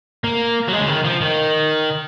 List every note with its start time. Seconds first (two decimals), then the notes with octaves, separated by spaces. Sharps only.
0.24 A#3
0.69 F#3
0.73 G#3
0.81 C#3
0.89 D#3
1.05 F3
1.22 D#3